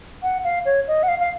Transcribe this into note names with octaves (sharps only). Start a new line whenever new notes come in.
F#5
F5
C#5
D#5
F#5
F5
F5